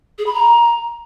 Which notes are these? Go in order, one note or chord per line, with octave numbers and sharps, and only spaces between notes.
G#4
B5
A#5